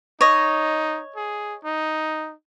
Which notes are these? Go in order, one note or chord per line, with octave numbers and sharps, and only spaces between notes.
D#4 C#5 D#5
G#4
D#4